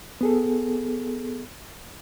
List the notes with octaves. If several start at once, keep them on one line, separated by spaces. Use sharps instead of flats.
B3 G#4 A4